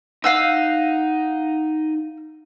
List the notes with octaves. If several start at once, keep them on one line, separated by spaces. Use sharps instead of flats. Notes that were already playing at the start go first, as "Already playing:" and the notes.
D#4 F5 F#5 E6